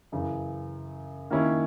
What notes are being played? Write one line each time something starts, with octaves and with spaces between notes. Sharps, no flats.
F#2 C#3 E3
D#3 A#3 C#4 E4